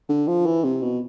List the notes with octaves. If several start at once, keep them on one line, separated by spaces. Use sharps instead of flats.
D3
F3
E3
C3
B2